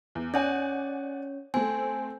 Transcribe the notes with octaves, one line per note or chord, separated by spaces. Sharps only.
E2
C#4 C#5 D5 F#5 G#5
A3 C4 G#5